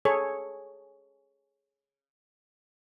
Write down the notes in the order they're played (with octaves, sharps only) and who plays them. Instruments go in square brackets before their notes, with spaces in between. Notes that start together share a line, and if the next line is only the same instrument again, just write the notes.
[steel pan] G#4 A4 C#5